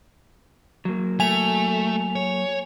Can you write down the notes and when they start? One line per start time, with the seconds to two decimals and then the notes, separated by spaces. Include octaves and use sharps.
0.85 F#3 A#3
1.20 A3 G#5 F7
2.15 C#5